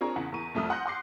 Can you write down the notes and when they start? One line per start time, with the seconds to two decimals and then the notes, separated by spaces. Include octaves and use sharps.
0.01 C4 D4 F4 G#4 A#4 C#5
0.16 E2 C#3 F#5
0.32 E2 A#4 C#6 D#7
0.54 C2 F2 A3 D#6 F6
0.70 F#5 C6 F#6 G6 A#6
0.86 F#5 C6 D6 C7